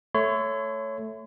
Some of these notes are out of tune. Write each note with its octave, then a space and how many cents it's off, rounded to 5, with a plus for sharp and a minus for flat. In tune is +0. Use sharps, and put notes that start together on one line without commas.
A3 +0 C#5 +0 C6 -45